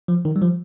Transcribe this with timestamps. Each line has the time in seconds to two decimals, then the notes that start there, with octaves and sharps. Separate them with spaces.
0.08 F3
0.25 D#3
0.36 G3
0.41 F3